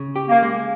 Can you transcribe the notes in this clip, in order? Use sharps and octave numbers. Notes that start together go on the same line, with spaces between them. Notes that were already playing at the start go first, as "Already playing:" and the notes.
Already playing: C#3
G4
A#3
G#3